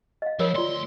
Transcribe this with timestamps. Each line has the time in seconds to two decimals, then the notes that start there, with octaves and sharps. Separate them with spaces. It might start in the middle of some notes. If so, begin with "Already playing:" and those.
0.22 D#5 F5
0.40 F3 A#4 C#5 B5
0.55 D2 F4 D5 C6